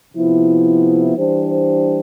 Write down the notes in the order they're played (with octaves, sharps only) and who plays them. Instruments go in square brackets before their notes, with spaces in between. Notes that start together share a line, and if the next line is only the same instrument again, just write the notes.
[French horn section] C3 F3 B3 E4
E3 G3 D4 G4 C5